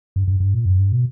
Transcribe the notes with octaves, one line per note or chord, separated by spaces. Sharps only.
G2
G2
G2
A#2
F#2
G2
B2